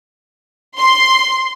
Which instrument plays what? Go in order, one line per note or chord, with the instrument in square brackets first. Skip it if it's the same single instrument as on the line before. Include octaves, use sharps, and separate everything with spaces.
[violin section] C6